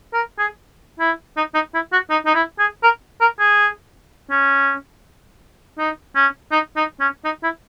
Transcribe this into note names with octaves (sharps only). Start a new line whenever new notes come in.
A#4
G#4
E4
D#4
D#4
E4
F#4
D#4
D#4
E4
G#4
A#4
A#4
G#4
C#4
D#4
C#4
D#4
D#4
C#4
D#4
E4